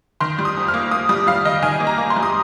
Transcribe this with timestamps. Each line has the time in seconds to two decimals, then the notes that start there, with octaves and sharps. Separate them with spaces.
0.20 D#3 C6
0.39 G3
0.45 D#6
0.57 F2
0.68 F6
0.74 A#3
0.91 A#3 D#6
1.09 G3 D#6
1.27 G3 F5
1.45 D#3 D#5
1.62 D#3 G#5
1.80 A#3
1.87 A#5
1.98 A#3
2.10 C6
2.16 G3
2.23 D#6